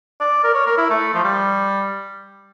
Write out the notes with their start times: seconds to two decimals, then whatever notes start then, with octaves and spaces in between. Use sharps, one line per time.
0.21 D5
0.44 A#4
0.55 C#5
0.67 A#4
0.78 E4
0.90 A3
1.14 F3
1.24 G3